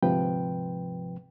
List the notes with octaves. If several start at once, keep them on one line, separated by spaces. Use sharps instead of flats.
D2 G#2 C3 F3 B4 G5